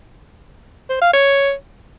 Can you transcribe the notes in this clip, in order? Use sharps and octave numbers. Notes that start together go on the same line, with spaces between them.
C5
F5
C#5